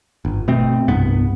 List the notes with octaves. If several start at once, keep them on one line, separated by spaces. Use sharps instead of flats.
G1
B2 A3 C4
C2 G2 B3